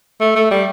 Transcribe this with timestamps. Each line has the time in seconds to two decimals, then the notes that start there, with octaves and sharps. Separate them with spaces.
0.20 A3
0.36 A3
0.51 G3